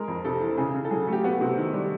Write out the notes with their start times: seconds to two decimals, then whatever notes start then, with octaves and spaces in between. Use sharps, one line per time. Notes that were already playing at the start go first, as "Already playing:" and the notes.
Already playing: G#3 A#4
0.08 F2
0.25 C3 A4
0.41 E3
0.58 C#3 G#4
0.74 C#3
0.85 A4
0.91 F#3 G#4
1.07 A3
1.13 G4
1.24 B3 F#4
1.41 C3
1.57 D#3
1.73 G3